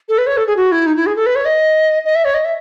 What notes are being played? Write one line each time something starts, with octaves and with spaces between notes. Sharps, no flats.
A4
B4
C#5
A4
G#4
F#4
E4
D#4
E4
G#4
A4
B4
C#5
D#5
D#5
E5
C#5
D#5
E5